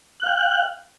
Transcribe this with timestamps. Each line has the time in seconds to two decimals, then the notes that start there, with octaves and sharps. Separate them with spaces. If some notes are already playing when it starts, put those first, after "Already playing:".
0.20 F#6
0.23 F5
0.27 G5